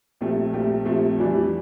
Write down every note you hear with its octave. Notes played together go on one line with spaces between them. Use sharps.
A#1 A#2 A3 C4 G4
A#1 A#2 A3 C4 G4
A#1 A#2 A3 C4 G4
F2 E3 G3 D4